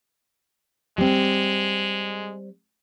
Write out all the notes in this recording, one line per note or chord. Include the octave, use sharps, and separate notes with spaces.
G3 G#3 C4